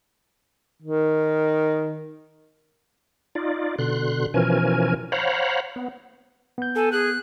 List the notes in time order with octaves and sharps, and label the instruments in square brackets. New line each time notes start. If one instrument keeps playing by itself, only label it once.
[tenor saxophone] D#3
[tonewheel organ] D#4 F4 D5
B2 D3 C6 F#6
B2 E3 F3 C#4 A#4 G#5
C5 C#5 F5 F#5 A#5 B5
B3
[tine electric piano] B3 G6
[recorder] A4 [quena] G#5
[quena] G#4 [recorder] F#6